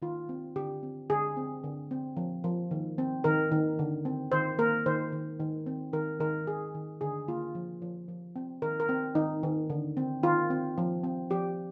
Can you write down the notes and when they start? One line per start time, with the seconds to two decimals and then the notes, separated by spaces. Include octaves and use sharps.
0.02 D#3 F4
0.29 C4
0.56 D3 G4
0.83 C4
1.10 D3 G#4
1.37 C4
1.64 D3
1.91 C4
2.17 F3
2.44 F3
2.71 D#3
2.98 C4
3.24 D#3 A#4
3.52 D#3
3.79 D3
4.05 C4
4.32 D#3 C5
4.58 A#3 A#4
4.86 D#3 C5
5.12 D#3
5.40 D#3
5.66 C4
5.93 D#3 A#4
6.20 D#3 A#4
6.47 D#3 G#4
6.75 D#3
7.01 D3 G#4
7.28 A#3 F4
7.55 F3
7.82 F3
8.08 F3
8.36 C4
8.62 D#3 A#4
8.80 A#4
8.89 C4
9.15 D#3 D#4
9.43 D#3
9.70 D3
9.97 C4
10.23 D#3 F4
10.50 C4
10.78 F3
11.04 C4
11.30 F3 G4